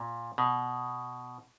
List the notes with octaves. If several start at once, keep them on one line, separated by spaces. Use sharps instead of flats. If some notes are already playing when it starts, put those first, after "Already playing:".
Already playing: A#2
B2